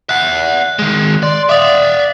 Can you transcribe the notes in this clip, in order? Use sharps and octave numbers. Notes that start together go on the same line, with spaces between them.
E5 F#5 F#6
D#3 G#3
D5 C6
D5 E5 F5 D6 D#6